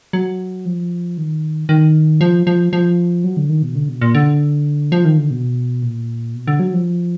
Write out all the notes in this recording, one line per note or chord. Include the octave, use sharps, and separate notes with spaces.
F#3
F3
D#3
D#3
F3
F3
F3
F#3
D3
D#3
B2
D3
B2
A#2
D3
F3
D#3
D3
B2
A#2
B2
D3
F#3
F3